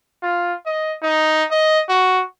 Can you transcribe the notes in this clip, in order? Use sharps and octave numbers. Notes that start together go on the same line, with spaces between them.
F4
D#5
D#4
D#5
F#4